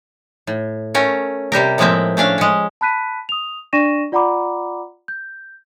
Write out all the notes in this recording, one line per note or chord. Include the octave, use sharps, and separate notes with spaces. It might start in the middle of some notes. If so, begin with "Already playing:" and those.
A2
A3 C#4 A#4
C3 G3 G4 A#4
A2 F3 G#3 A#3 C4 E5
A3 C#4 D4 F5
G#3 C#4
A5 B5 F#6 B6 D#7
D#6 F7
D4 D5 C#6 A#6 D#7 E7
F4 D5 F#5 A#5 B5 D6
G6